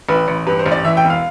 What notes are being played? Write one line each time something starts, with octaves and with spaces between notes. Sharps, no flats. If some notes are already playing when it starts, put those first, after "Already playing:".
A1 B4
A1
G2 B4
C5
A1
D5
E3 E5
G5
E1
F5